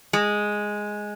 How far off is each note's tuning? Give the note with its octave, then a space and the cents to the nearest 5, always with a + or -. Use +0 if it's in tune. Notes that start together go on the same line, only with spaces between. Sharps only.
G#3 +0